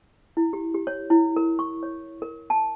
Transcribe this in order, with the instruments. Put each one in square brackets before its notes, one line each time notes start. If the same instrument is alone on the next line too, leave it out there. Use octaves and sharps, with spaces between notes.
[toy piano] E4
G4
G4
C#5
E4
A#4
C#6
C#5
A#4
A5